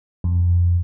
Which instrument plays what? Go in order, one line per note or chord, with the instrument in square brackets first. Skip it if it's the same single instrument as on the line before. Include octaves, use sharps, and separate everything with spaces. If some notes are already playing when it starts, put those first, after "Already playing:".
[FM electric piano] F2